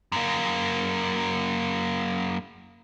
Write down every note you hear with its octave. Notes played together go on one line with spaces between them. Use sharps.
F#2 A#3